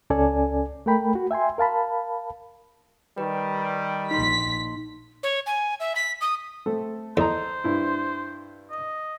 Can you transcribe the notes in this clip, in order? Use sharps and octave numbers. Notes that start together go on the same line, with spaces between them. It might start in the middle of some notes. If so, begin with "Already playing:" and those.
C#2 C#4 A4 D5 G#5
A3 A4 A#4 G5 B5
F#4
E5 G5 G#5 C6
A#4 F5 A5 B5
D#3 G3 B4
A#1 D#4 C6 B6
C#5
G#5
E5
B6
D#6
A3 C4 A4
E2 A4 C5 D#5 A#5
G2 E4
D#5